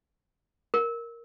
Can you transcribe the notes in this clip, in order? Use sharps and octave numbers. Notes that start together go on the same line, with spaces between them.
A#4